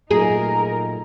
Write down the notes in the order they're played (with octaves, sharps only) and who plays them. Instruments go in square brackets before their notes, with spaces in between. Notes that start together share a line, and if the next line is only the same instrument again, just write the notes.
[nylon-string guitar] A#2 F#3 A3 [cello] D#4 A#4 [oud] G#4 [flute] A#5